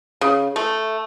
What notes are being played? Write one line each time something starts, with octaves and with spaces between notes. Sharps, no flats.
C#3
A3